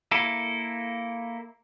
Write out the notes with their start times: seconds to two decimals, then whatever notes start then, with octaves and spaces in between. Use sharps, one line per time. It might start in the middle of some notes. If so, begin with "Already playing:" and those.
0.11 A#3 E4 A4